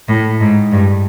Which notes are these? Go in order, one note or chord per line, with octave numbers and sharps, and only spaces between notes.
A2
G#2
G2